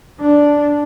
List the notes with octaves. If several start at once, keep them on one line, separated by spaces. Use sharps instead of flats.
D4